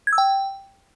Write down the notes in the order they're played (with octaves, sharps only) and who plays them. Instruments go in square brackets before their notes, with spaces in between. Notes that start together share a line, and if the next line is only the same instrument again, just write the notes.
[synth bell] G#6
E6
G5